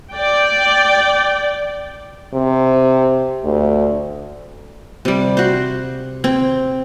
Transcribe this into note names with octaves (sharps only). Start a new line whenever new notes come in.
D5 G5
C3
D2
C3 G3
F#4 C5
C4